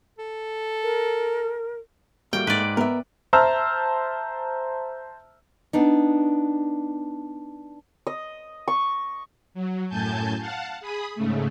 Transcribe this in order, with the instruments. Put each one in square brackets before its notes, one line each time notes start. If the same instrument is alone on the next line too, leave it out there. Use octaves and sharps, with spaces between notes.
[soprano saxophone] A4
[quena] A#4
[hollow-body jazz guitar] A2 A#3 [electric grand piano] G3 F#4 [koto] G5
[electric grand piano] G#2 [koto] B4 D5
[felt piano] B3 [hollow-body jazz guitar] A#4 E5
[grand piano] C5 E5 A5 A#5 E6 F6
[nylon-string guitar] B3 D4 D#4
[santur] D#5
C#6
[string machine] F#3
F#2 A2 G#5 A5 G6
F5 F#5 A5
G#4 B5 D#6
G#2 C#3 A3